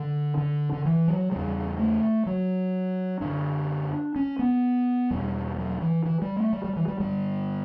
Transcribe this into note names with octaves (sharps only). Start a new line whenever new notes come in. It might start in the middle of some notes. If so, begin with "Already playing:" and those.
Already playing: D3
D3
D3
E3
F#3
E2 C#3 G3
A3
F#3
F#2 D3 D4
C#4
B3
E2 B2 G3
F#3
E3
E3
G3
A3
G3
G3
E3
G3
G2 D3 G3